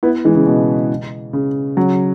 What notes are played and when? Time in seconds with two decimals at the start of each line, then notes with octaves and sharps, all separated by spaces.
0.03 B3 E4
0.25 E3 G#3
0.35 C#3
0.47 B2
1.33 C#3
1.77 C#3 F#3